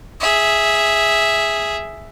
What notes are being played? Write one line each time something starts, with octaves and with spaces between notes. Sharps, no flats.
G#4 E5